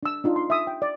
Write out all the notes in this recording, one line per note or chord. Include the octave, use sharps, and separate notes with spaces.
D4 E6
D4 D#4 F4
C6
E5 D#6
G5
D5